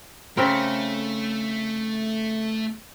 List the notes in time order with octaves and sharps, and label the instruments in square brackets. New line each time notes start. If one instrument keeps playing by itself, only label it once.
[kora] C#3 C4 A#4 [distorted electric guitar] A3